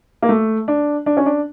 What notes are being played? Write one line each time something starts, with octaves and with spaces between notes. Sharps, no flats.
A#3
A3
D4
D4
C#4
D4